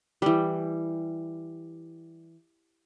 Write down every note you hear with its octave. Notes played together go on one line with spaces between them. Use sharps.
E3 G3